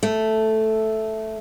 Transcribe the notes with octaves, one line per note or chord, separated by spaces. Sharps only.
A3